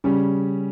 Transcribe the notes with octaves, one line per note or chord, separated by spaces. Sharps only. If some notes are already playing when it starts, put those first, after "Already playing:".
C#3 G3 C#4